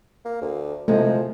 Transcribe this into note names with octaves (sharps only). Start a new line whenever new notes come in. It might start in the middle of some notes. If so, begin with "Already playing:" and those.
A#3
D2
C3 F3 F#3 G#3 A3